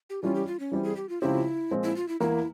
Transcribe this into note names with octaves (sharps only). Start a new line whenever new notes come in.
G4
E3 G3 C#4 F4
G4
F4
C#4
E3 G3 C4 G4
G#4
G4
F4
C#2 C#3 F3 C4 E4 G4
A#2 F3 G#3 C4
E4
F4
E4
E2 E3 A#3 E4